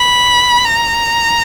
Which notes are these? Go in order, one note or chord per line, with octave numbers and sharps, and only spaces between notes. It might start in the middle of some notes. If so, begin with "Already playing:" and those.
Already playing: B5
A#5